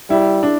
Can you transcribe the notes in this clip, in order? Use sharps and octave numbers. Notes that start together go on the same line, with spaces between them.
G3 E4
D4